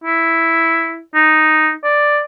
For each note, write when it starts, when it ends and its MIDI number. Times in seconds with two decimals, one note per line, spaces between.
0.04 1.00 64
1.15 1.71 63
1.84 2.20 74